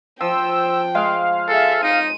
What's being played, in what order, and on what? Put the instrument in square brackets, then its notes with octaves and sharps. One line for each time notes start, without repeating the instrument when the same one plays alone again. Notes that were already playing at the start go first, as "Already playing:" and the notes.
[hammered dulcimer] F3 [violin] G5 [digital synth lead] E6
[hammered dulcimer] G#3 [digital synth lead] F5
[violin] G#4 E5 [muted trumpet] A4
[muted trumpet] D#4 [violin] D#7